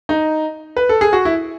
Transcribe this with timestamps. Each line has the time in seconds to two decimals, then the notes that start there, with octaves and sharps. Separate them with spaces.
0.09 D#4
0.77 B4
0.89 A4
1.01 G#4
1.13 F#4
1.25 E4